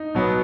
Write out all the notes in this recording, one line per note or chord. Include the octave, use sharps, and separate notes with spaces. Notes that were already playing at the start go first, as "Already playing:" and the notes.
Already playing: D#4
B2 F#3 B3